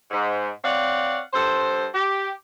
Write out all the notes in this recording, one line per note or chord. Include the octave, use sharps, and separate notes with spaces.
G#2
C4 C#5 D5 F5 F#5
G2 A4 C5
G4